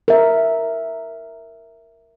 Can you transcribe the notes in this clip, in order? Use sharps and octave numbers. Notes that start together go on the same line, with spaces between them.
A#4 E5